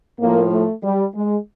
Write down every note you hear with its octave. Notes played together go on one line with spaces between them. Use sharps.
A2 F3 A#3
A3
G3
G#3